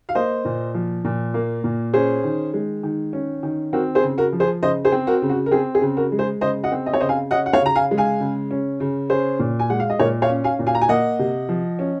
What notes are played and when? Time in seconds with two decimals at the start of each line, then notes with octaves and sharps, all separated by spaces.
0.09 F5
0.15 A#3 C5 D#5
0.45 A#2
0.74 F3
1.05 A#2
1.34 A#3
1.64 A#2
1.94 C#4 G#4 C5
2.24 D#3
2.54 G#3
2.83 D#3
3.13 C#4
3.43 D#3
3.73 C4 F#4 A#4
3.95 G#4 C5
4.03 C#3
4.18 F#4 A#4
4.33 F3
4.40 G#4 C5
4.62 C#3 C5 D#5
4.85 G#4 C5
4.92 C4
5.07 F#4 A#4
5.22 C#3
5.29 F#4
5.46 A#4
5.51 C4 G#4
5.75 G#4
5.82 C#3
5.97 F#4 A#4
6.12 G#3
6.19 G#4 C5
6.41 C#3 C5 D#5
6.63 D#5 F#5
6.72 C4
6.86 D#5
6.93 C#5
7.00 C#3 C5 D#5
7.09 F5 G#5
7.31 C#4 D#5 F#5
7.46 F#5
7.53 C#5 F5
7.61 C#3 A#5
7.75 F5 G#5
7.91 G#3
7.98 F5 G#5
8.20 C#3
8.51 C#4
8.80 C#3
9.10 C#4 G#4 C5
9.39 A#2
9.60 G#5
9.70 G#3 F#5
9.80 F5
9.90 D#5
9.99 A#2 A#4 C#5
10.22 C#5 F5
10.29 C#4
10.44 F5 G#5
10.59 A#2
10.67 F5 G#5
10.75 A#5
10.82 G#5
10.88 A#3 D#5 F#5
11.19 C3
11.49 F3
11.79 C#4